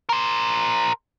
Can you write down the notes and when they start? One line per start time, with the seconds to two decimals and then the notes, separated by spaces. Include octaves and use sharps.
0.09 A#4 C5